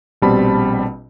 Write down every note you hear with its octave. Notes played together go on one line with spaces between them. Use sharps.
A#1 B2 G3 C4 A5 B5